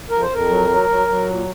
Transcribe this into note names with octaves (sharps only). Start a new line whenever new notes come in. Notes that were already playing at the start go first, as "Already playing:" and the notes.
F2 A#4
C5
F2 A#4
F#3
F#3
F#3
F#3
A#2